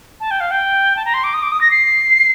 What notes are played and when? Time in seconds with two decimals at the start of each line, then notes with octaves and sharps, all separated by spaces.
0.20 A5
0.31 G5
0.40 F5
0.51 G5
0.96 A5
1.05 A#5
1.14 C6
1.24 D6
1.34 D#6
1.43 D6
1.52 D#6
1.61 A#6
1.71 C7